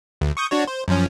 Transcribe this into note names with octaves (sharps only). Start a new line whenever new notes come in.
D2
C#6 D#6 G6
D4 F#4 C#5
C5
F#2 F3 C#4